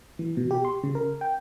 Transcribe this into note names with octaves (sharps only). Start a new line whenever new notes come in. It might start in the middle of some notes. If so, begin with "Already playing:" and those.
E3
B2
G4
C6
C#3
A#4
G5